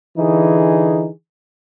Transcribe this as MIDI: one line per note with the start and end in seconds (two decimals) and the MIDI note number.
0.17 1.08 50
0.17 1.08 52
0.17 1.08 63
0.17 1.08 68